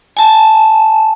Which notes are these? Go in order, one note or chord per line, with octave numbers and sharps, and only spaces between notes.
G#5 A5